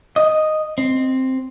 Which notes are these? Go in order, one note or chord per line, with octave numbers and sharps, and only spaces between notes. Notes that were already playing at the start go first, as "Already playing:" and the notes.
D#5
C4